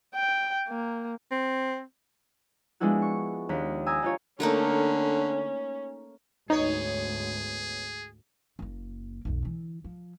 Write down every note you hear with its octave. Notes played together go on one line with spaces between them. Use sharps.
G5
A#3
C4
F3 G#3 B3 D4 E4 F#4
C#6
D#2 D4 B6
G#5 A#5 D#6 E6
D4 D#4 F4 G4 C#5
D3 A3 A#3 C#4 D#4
D2 G#2 B3 D#4 G#4 C#5
F#1 A#3
B1 F2
D3 E3
F3